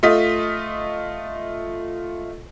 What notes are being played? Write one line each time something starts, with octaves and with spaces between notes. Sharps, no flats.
A3 F4 D#5 B6